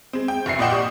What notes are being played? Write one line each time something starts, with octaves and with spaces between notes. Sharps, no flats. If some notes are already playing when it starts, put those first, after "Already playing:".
G#3 C4
G5
F1 G2 E5 C7 C#7
A#2 D5 D#5 F#5 G5 E7
G4 C#6 D#6